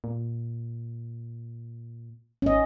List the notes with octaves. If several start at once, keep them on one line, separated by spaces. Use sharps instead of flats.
A#2
G#1 C#4 D#5